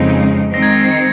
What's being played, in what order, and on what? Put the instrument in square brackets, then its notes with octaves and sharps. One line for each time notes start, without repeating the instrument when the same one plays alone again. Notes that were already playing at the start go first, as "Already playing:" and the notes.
Already playing: [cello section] F2 C#3 G#3 C4 D#4
[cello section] D#3 G#3 C4 D#4 [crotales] A#6
[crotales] G#6
A#6
C7
C#7